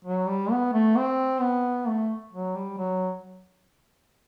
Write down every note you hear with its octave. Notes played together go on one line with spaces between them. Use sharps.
F#3
G3
B3
A3
C4
B3
A3
F#3
G3
F#3